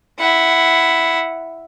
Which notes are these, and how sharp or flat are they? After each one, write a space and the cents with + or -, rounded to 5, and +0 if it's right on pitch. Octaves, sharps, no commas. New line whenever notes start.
E4 +0 F#5 +0